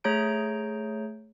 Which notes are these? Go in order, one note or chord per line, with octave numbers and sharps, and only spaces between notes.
A3 G#4 C#5 A#5 G6 D7